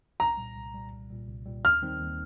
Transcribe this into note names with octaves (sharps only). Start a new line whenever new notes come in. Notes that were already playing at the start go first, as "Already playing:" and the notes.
C2 A#5
A#2 G3
C2
A#2 G3
C2
A#2 G3
C2
A#2 G3
D#2 F6
D#3 G3 C4 D#4
D#2